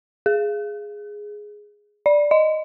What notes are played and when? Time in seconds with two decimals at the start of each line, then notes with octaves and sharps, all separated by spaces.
0.26 G#4
2.06 D5
2.31 D#5